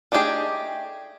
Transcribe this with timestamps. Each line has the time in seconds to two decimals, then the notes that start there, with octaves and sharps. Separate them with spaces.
0.12 A3 D4 D#4 G4 G#4